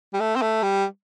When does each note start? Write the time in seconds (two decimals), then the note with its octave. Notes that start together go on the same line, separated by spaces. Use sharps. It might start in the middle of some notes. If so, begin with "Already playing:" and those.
0.13 G3
0.20 A3
0.36 C4
0.42 A3
0.63 G3